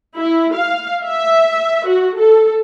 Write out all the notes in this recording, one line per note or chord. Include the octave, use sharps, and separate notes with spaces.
E4
F5
E5
F#4
A4